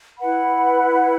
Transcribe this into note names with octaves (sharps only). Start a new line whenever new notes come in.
E4 B4 F#5 B5